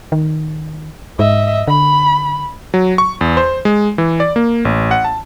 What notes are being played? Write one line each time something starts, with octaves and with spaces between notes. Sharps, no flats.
D#3
G#2 D#5 E5
D3 B5
F#3
C#6
E2
C5
G#3
E3
D5
A#3
A1
F#5
A5